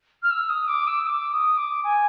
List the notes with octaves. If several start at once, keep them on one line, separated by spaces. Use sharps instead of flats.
F6
E6
D#6
D6
E6
D6
D#6
D6
G#5